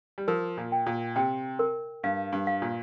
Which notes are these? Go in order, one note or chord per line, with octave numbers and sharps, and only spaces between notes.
G3
F3 A#4
A#2
G5
A#2
C3 G5
A#4
G2 F5
G2
F5
A#2